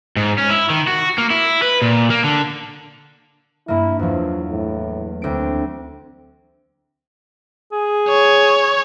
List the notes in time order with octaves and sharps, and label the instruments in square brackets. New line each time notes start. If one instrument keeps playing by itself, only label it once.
[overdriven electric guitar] G#2
C#4
E4
D#3
F#4
A#3
E4
B4
A#2
A#3
D3
[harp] G2 A#3 [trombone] E4
[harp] E2 F#3 [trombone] F3
[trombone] A2
[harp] D2 D7 [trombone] C4
[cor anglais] G#4
[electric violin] C#5